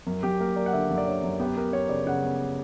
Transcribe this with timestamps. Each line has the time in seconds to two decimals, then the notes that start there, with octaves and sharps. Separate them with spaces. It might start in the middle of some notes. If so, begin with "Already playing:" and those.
0.06 F#2 A#4
0.23 F#2 G4
0.40 A#3 A#4
0.56 A#3 D5
0.66 F#5
0.73 D3 E5
0.90 F#2
0.98 D5
1.07 D3 C#5
1.23 F#2
1.40 B3 G4
1.56 B3 A#4
1.73 B3 C#5
1.89 C#3 D5
2.06 C#3 F#5
2.23 B3